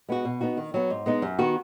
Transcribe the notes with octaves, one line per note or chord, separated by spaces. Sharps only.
G#3 B3 F#4
B2
B3 D#4 F#4
D#3
F#3 B3
G#2
G#3 B3 D#4
F#2
D#3 B3 F#4